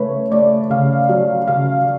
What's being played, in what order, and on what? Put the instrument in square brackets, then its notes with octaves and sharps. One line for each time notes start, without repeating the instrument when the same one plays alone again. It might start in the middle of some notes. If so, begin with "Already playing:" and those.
Already playing: [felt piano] C#3 A3 B4 C#5
A3 D5
C#3 F5
F#3 D5
C#3 F5